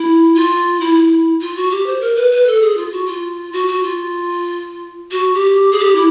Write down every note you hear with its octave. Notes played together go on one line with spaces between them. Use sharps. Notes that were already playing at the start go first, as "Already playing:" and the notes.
Already playing: E4
F4
E4
F4
F#4
G4
C5
A#4
B4
B4
A4
G#4
F4
F#4
F4
F#4
F#4
F4
F#4
G4
G#4
G4
E4